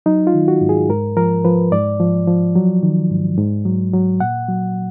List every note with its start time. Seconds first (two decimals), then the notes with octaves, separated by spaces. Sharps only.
0.06 F#3 D#4
0.27 F4
0.34 D#3
0.48 F#4
0.61 G#2
0.69 G#4
0.89 G#2 A#4
1.17 F3 A#4
1.45 F3 B4
1.72 G#2 D5
2.00 F3
2.27 F3
2.56 F#3
2.83 D#3
3.10 G#2
3.38 G#2
3.65 F#3
3.93 F#3
4.20 A#2 F#5
4.48 F#3